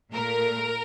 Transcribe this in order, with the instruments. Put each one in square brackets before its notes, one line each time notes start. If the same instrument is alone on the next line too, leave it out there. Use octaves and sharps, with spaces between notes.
[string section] A#2 A3 A#4